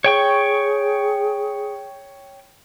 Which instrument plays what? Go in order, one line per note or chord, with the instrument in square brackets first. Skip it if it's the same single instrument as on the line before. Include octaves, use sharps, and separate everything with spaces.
[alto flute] G#4 [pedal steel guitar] C#5 G5 C#6